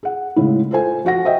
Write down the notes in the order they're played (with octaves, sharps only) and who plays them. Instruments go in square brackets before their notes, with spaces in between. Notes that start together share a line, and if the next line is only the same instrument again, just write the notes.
[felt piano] G#4 F#5
A2 C#3 G#3 E4
F4 A4 C5 G#5
F3 F#4 F#5 A#6
C5 D#5 E5 G5